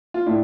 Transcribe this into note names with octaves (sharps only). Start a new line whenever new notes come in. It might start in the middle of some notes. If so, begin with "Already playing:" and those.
F4
A2 D4 E4